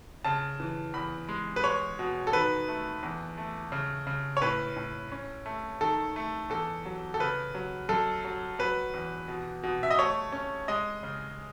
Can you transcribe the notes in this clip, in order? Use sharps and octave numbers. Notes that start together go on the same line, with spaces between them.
C#3 A5
E3
E2 B5
G#3
B4
G#3 C#5
B2
A4
D#3 B4
A3
E2
A3
C#3
C#3
C#5
A2 B4
A2
C#4
A3
D#3 A4
A3
E2 A4
F#3
A4
C#3 B4
F#3
F#2 A4
F#3
F#3 B4
E2
B2
B2
E5
D#5
A3 C#5
C#4
G#3 D#5
C#3